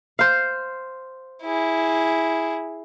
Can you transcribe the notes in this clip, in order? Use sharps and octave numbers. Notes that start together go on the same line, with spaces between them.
C5 F5
E4 G#4